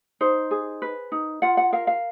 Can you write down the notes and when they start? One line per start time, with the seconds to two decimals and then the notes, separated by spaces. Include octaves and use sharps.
0.21 D#4 C5
0.51 G#4
0.82 B4
1.12 D#4
1.42 F4 F#5
1.57 F#5
1.72 A#4 F5
1.87 F5